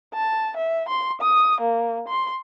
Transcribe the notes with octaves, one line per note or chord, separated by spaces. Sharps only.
A5
E5
C6
D#6
A#3
C6